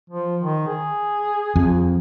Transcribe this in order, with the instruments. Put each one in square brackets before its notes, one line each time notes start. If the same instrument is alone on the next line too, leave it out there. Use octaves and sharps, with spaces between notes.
[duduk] F3
D#3
G#4
[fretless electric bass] F2